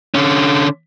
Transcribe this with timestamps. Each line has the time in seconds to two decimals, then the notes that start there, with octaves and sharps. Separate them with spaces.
0.14 D3 C#4